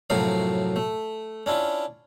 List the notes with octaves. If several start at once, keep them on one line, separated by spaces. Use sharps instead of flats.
F#2 A2 C3 F3 F#3 F5
A3
C#4 D4 E4 F4